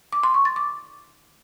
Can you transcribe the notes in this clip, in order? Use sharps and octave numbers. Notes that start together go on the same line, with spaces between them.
D6
C6
C#6
A6
D6